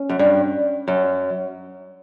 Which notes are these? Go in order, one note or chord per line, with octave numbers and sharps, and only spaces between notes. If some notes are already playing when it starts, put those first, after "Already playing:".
Already playing: C#4
F#2
G2
F#2